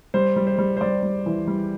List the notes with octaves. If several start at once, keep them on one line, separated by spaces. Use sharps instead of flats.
G3 C5
G3
C5
G3
C5
G3 D5
G3
E3
G3